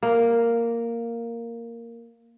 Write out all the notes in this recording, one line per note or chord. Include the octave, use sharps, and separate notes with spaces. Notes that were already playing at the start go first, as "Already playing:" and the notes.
A#3